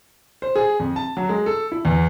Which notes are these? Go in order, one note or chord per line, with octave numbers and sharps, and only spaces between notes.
C5
G#4
F2
A5
F#3
G#3
A4
E4
E2